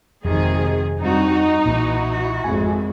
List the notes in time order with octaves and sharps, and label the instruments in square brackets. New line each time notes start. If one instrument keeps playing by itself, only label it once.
[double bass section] G#1 G#2 [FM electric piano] F2 [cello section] C3 D#3 [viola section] G#4
[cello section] G2 F#4 [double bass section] C4 [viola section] D#4
[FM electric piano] B1 A#2 [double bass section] E3 [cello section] E4 F#4
[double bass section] G#1 F2 G#3 [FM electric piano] G#5